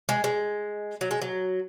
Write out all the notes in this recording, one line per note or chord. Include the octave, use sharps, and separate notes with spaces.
G#3
G#3
F#3
G#3
F#3